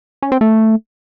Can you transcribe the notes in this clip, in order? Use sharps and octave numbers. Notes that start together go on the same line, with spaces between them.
C#4
C4
A3